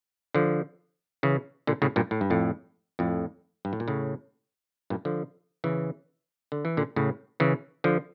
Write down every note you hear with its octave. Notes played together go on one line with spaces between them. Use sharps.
D3 F3
C#3 E3
A#2 D3
A2 C#3
G2 A#2
A2
G2
F2 A2
F2 A2
G2
A2
A#2
A2 C#3
G2 A#2
D3 F3
C#3 E3
D3
E3
A#2 D3
A2 C#3
C#3 E3
D3 F3